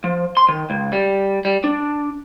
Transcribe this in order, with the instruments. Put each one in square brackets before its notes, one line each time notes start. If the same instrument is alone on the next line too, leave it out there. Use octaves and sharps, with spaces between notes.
[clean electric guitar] F3
C6
D#3
C#2
G3
G3
D4